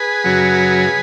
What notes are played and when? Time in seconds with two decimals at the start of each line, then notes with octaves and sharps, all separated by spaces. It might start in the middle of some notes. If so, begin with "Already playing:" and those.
Already playing: G#4 B4
0.24 F#2 C#3 F#3